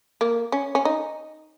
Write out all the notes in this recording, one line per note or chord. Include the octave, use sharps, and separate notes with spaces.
A#3
C#4
C#4
D#4